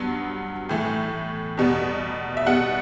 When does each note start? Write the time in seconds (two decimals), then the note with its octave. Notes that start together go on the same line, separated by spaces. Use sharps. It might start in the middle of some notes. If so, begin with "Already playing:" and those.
Already playing: G2 F#3 B3
0.69 A2 E3 A3
1.57 E2 B2 G3 B3
2.37 E5
2.46 B2 G3 B3 F#5